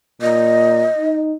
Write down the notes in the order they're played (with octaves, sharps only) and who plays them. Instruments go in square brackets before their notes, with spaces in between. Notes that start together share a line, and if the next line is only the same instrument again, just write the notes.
[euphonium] A#2 [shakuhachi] D#5
[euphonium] D#4